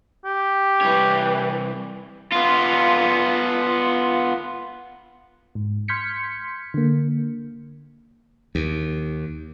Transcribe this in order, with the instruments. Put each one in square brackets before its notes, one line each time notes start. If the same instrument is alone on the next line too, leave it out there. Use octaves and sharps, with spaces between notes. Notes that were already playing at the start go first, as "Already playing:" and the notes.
[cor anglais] G4
[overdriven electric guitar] C2 C#5 [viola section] E3
[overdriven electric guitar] B3 F4
[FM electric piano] G#2
C6 F6 G6 G#6 B6 C#7
D3 A#3
[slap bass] D#2